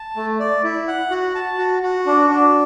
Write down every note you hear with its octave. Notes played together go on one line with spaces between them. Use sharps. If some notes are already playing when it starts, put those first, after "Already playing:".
Already playing: A5
A3
D5
E4
F#5
F#4
A5
F#4
F#4
D4
D4